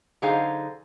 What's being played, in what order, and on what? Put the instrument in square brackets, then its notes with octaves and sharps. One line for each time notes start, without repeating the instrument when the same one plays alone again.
[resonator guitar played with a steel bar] D3 F#3 D#4 G#4 C5 F5